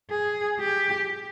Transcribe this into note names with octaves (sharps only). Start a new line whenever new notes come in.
G#4
G4